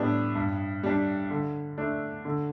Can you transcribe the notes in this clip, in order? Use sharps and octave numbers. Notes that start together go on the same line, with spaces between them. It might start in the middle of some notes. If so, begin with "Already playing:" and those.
Already playing: A2 G3 B3 D4
G2
G3 D4
D3
A3 D4
D3